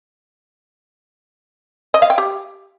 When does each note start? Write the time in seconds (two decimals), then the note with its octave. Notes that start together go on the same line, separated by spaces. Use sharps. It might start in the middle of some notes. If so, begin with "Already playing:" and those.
1.94 D#5
2.02 F5
2.10 G5
2.18 G4